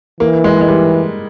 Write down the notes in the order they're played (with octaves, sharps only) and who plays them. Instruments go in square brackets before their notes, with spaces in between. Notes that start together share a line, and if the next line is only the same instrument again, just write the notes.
[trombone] E3 [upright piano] A#3
[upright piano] G#3
G#3
G3